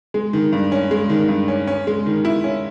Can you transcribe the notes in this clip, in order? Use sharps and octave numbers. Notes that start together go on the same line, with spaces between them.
G#3
D#3
G2
C#4
G#3
D#3
G2
C#4
C#4
G#3
D#3
E4
C#4